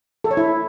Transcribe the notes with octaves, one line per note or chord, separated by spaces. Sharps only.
A4
C#5
E4